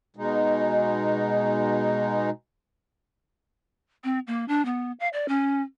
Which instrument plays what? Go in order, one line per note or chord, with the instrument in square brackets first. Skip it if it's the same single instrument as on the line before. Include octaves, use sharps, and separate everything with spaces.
[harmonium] B2 G#3 D#4
[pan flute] C4
A#3
D4
B3
F5
D5
C#4